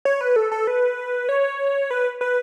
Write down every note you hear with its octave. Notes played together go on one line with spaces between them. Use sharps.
C#5
B4
A4
A4
B4
C#5
B4
B4